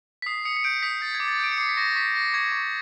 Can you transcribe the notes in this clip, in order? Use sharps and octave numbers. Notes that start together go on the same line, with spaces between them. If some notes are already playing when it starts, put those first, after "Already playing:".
B6
D#6 C7
D#6 C#7
C#7
G6 D7
D#6 B6
G6 A6
G#6
D6
A6
G6 D7
C#7
D6 C7
B6
C#6 A#6
C#6 B6
C#6 A#6
C#6 G#6
C#6